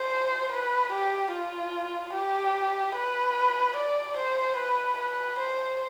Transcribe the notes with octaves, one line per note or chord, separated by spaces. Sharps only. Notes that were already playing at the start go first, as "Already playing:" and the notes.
Already playing: C5
B4
G4
F4
G4
B4
D5
C5
B4
B4
C5